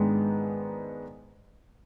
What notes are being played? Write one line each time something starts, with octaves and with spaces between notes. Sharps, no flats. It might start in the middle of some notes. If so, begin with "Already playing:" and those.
Already playing: G#2 D#3 G#3 B3 D4